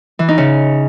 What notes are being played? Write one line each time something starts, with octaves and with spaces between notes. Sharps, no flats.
E3
D#4
C#3